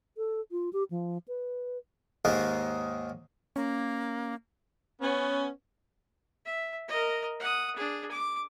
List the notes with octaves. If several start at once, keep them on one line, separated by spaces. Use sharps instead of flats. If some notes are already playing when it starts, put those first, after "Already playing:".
A4
F4
G4
F3
B4
D#2 G#2 D#3 G#3
A#3 C#4
B3 C#4
E5
A#4 D#5
F#5 D#6
D4 G#4
D6